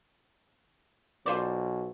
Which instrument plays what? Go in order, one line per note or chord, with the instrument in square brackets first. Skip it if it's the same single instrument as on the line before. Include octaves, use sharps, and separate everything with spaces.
[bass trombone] B1 [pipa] F4 C5 D5